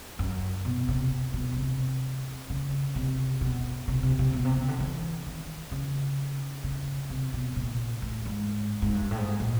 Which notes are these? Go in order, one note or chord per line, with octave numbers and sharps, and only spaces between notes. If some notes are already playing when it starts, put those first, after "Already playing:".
F#2
B2
C3
B2
C3
C#3
C3
B2
C3
C3
C3
B2
C3
C#3
D3
E3
D#3
C#3
C#3
C3
B2
A#2
A2
G#2
G#2
G2
A2
G#2
A#2